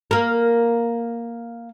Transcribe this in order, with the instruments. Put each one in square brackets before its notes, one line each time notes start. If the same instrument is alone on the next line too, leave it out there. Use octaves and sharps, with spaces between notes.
[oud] A#3 A#4